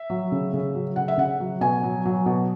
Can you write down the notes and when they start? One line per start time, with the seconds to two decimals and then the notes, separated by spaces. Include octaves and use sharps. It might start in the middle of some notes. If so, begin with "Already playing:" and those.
Already playing: E5
0.10 F#3
0.32 C#3
0.53 C#3
0.75 F#3
0.96 C#3 F#5
1.08 E5
1.17 C#3 F#5
1.40 F#3
1.61 B2 G#5
1.83 F#3
2.05 F#3
2.26 B2